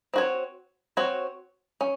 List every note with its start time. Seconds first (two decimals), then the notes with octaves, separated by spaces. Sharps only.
0.14 C4 F#4 C#5
0.97 C4 F#4 C#5
1.81 C#4